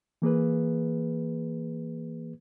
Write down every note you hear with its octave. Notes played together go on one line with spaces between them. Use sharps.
E3 A#3 G#4 B4